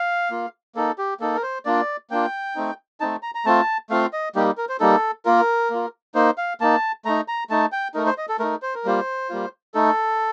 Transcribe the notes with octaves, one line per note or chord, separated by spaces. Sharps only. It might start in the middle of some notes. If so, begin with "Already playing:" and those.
Already playing: F5
A#3 F4
A#3 D#4 A4
G4
A#3 D#4 A4
A#4
C5
A#3 D4 F4 D5
A#3 D4 F4 G5
A3 C4 D#4
A3 C4 D#4 A5
A#5
A#5
A3 C4 F4 A5
A3 C4 F4 F5
D#5
G3 A#3 D#4 G4
A#4
C5
G3 A#3 D#4 A4
A#3 F4 A#4
A#3 F4
A#3 D#4 C5
F5
A#3 D#4 A5
A3 D#4 A#5
A#5
A3 D#4 A5
G5
A3 D#4 A#4
C5
D#5
A4
A3 D#4 A#4
C5
A#4
G3 A#3 F4 C5
G3 A#3 F4
A3 D#4 A4